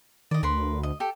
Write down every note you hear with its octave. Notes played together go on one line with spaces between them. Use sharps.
D#3 D5 D#5
D2 A#4 B4 C6
D#5
G4 A4